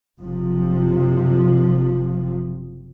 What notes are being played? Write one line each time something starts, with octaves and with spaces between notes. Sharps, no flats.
F#1 C3 F3